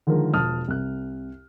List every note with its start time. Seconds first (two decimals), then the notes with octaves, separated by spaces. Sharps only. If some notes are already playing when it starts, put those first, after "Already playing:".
0.07 D3 D#3 F3 G#3 A#4
0.34 E1 F3 A5 D#6 F6
0.68 C2 F#6